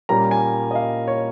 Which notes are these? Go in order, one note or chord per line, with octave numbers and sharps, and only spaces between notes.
A#2 G3 A#3 C#4 A#5
G#5
D#5
F5
C#5